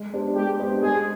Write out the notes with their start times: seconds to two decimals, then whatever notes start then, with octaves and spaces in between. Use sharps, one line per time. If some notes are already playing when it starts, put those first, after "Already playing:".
Already playing: G#3
0.13 B3 D4 G4 C5
0.35 G#3 G4
0.59 B3 D4 G4 C5
0.82 G#3 G#4